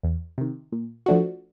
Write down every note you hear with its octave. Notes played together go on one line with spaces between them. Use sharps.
E2
C3 D#3
A#2
F3 A3 D4 F#4